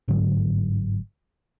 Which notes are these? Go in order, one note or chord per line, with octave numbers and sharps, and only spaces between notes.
G1 G#2 D3 F#3